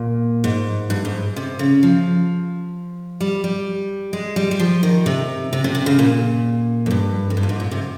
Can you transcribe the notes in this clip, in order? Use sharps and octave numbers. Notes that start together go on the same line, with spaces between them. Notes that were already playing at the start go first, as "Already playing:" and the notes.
Already playing: A#2
G#2
G2
G#2
C3
C#3
F3
G3
G3
G#3
G3
G3
F3
D#3
C3
C3
C3
C3
C#3
A#2
F2
G2
F2
G2
A#2
G#2
A#2
C3